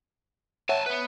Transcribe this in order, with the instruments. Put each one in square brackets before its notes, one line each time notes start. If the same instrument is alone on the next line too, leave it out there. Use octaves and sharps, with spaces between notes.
[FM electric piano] C#5 E5 F#5 [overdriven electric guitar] G#5 A5
[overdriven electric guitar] B3 B4